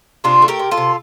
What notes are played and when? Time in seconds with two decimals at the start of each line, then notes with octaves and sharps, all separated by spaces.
0.24 C3 D4 F4
0.42 A3
0.48 G4 A#4
0.59 C3
0.71 F4 A4
0.77 C3